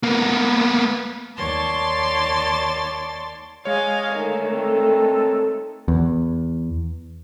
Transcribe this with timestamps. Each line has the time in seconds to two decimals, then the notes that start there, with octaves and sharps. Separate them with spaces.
0.03 A#3 B3
1.37 D#2 C#5 D5 A5 C6 A6
3.65 G#3 C#5 D#5 F5 G#5
4.15 D3 D#3 A3
4.51 C4 A4
5.88 E2